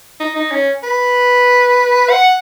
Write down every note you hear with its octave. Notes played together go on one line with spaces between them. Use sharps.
D#4
D#4
C#4
B4
F#5